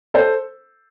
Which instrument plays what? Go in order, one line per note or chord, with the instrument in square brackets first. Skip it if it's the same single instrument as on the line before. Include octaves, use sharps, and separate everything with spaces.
[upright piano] A4 C5